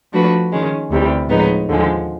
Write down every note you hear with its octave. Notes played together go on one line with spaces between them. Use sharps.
F3 A3 D4 F#4 B4
D#3 G#3 C#4
D2 C3 E3 G3
A2 F3 G#3 B3 D#4
D#2 D3 F3 G#3